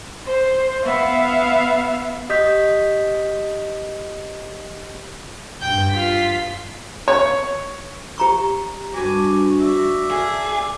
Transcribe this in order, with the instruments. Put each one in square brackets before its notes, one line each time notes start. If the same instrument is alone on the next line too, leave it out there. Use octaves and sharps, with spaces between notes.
[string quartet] C5
B3 E5 F5
[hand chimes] G4 D#5 D#6 G6 B6
[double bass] G2 [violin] G5 G6
[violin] F4 B6
[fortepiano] C#5
[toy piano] G4 A#5 C#6
[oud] G2 B4 [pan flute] F#4 [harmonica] G#5 D6
[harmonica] D5 E5
[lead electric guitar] G#4 [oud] A4 F5